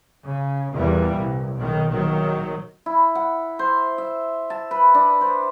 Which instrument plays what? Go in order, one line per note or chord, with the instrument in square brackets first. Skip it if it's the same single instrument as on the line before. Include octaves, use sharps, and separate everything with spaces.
[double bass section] C#3
E2 A#2 E3 G3
C2
B1 B2 D#3
A#1 D#3 F#3
[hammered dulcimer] E4
F#5
C5
E5
A5
B4
D4
C5